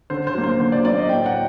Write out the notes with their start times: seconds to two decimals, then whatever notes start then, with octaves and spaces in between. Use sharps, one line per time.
0.10 D3 C5
0.27 C5
0.34 F#3 A#3
0.44 C5
0.60 D3 C5
0.72 D5
0.84 F#3 A#3 D5
0.97 D#5
1.09 A2 G5
1.26 F#5